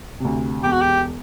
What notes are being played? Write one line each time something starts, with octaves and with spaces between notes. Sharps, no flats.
D2 C3
E1 G4
F#4
G4